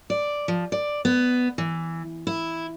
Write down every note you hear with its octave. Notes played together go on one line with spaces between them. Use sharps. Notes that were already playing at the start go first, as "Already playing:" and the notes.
D5
F3
D5
B3
E3
E4